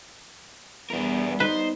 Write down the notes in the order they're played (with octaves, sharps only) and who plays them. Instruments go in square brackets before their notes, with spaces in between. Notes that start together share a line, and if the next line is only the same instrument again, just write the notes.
[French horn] E2 [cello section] G3 B3 [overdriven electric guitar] D4 A#4
[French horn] D#4 [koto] B4 [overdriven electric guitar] C5